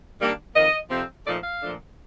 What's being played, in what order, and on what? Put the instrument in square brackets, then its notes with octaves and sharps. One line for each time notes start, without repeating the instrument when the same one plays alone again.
[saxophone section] D#3 G3 A#3 D4
F2 D#3 A#3 D#5
F2 C3 F3 C4
A#2 F3 A3 D#4 D5
F5
A#2 F3 A3 D4